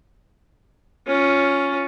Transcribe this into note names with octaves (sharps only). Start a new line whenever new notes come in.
C#4 F4